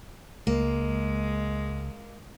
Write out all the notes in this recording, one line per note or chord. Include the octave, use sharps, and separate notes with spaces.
C#2 G#3 A#3